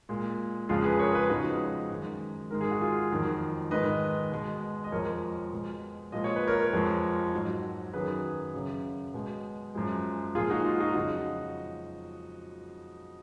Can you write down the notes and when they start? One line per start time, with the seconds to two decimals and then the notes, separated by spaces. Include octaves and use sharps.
0.09 A#2 G#3
0.69 F2 C#3 G#3 F4 G#4
0.84 G#4 B4
0.99 A#4 C#5
1.15 G#4 B4
1.29 F2 C#3 G#3 D#4 F#4
1.90 F#2 D#3 G#3
2.51 G#2 D#3 G#3 A#4
2.61 G#4
2.71 F#4
2.81 F4 G#4
3.11 F2 D#3 F#3
3.71 G#2 D#3 G#3 B4 D#5
4.32 B2 G#3
4.84 D#5
4.92 F2 F3 G#3 A#4 C#5
5.52 B2 G#3
6.12 A#2 F3 G#3 D#5
6.24 C#5
6.36 B4
6.47 A#4 C#5
6.73 F2 F3 G#3
7.33 G#2 F#3
7.93 F#2 D#3 F#3 G#4 B4
8.54 F#2 C#3 F#3
9.14 B2 G#3
9.75 F#2 F3 G#3
10.35 A#2 F3 G#3 F4 G#4
10.50 D#4 F#4
10.65 F4
10.80 D#4 F#4
10.95 F2 C#3 F#3 D#4 F#4